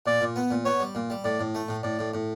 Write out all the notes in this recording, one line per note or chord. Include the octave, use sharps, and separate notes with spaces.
A#2 D5
A#2
B3
A#2
B3 C#5
G3
A#2
G3
A2 D5
A2
A3
A2
A2 D5
A2
A2